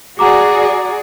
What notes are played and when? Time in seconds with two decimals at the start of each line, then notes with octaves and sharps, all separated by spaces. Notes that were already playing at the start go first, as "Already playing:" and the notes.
0.19 F#4 G#4 D5 F#5 A#5 D6